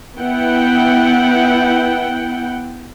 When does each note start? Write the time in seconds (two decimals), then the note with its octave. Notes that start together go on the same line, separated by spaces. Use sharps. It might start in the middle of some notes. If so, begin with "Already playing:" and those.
0.17 B3 E4 F#5 G5